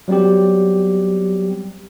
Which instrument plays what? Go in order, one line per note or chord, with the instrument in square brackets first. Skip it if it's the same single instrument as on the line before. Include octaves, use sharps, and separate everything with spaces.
[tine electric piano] F#3 G3 B3 C4 G4